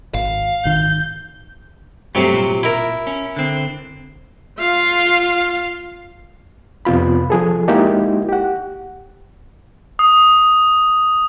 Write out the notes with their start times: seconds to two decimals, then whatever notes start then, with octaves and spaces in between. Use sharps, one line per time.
0.14 G#1 F5
0.65 G#1 D#3 G6
2.15 G2 C3 F#3 A3 C4
2.34 A#2
2.63 E4 A#4
3.07 C#4
3.36 D3 C4
4.59 F4 F5
6.85 F2 C3 B3 F4 B5
7.30 F3 G#4 A4
7.68 G#3 A#3 D#4 E4 F#4 G4
8.29 G4 F#5
9.99 D#6